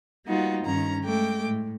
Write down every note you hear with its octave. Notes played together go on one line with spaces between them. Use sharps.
G3 A#3 B3 D#4 F4 F#4
G2 D#3 C#4 A#5
G#3 A3 G5 D6
A2